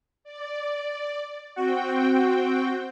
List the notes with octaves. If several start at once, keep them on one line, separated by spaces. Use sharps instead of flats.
D5
C4 F#4 G5